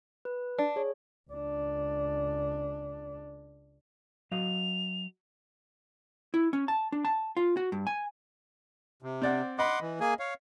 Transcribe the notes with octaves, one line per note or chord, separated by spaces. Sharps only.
B4
D4
G#4 C#5
C#2 D4
F#3 D#5 F5 F7
E4
C#4
A5
D4
A5
F4
F#4
G2
G#5
C3
C4 D5 F#5
D#5 F#5 B5 C6 D6
E3
A#3 G#4 G#5
C#5 F5